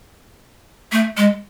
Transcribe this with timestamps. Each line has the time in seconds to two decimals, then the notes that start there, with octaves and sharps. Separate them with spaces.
0.92 A3
1.17 G#3